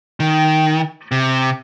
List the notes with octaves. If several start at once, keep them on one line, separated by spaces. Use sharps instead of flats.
D#3
C3